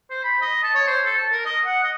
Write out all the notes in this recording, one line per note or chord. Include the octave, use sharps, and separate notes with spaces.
C5
B5
D#5
A5
C#5
C5
A4
A5
A#4
D#5
F#5
D#5